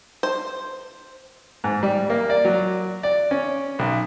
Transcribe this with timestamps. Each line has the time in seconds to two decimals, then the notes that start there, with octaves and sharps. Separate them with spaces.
0.23 C5
1.64 G#2
1.83 G3
2.10 A#3
2.30 D5
2.45 F#3
3.03 D5
3.31 C#4
3.79 B1